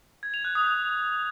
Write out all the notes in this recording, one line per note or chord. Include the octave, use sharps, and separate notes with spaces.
G#6
F7
F#6
D#6
G6